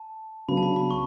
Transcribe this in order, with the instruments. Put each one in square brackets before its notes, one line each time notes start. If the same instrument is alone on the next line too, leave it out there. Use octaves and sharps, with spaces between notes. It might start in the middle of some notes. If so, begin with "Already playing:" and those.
Already playing: [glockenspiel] A5
[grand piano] C#3 F#3 B3 D4 [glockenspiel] B5
[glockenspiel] A5
B5
B5
C#6